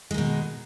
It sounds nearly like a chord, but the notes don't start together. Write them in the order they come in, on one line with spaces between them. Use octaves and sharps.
G#3 D#3 B2